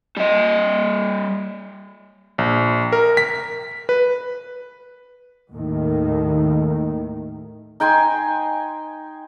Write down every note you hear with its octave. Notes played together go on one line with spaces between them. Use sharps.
G3 D#5
A#1
A#4
B6
B4
D#2 A2 D#3
D#4 G5 G#5 C6